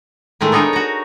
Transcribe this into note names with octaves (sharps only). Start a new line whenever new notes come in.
A2 D#3 G#3 A3
B3 D4 D#4 G#4 A#4 C#5
F#4 A#5